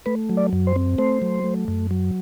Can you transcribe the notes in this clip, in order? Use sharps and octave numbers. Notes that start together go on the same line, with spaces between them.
A3 B4
F#3
D5
F#2
C5
C4
A3 C5
F#3
A3
F#2
F#3